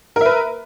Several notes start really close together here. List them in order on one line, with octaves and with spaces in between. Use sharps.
A#4 E5 B4